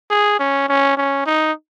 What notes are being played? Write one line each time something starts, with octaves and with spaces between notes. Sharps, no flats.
G#4
C#4
C#4
C#4
D#4